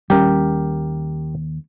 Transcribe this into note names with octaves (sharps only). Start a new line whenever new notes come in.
D#2 G3 C#4 G4 A#4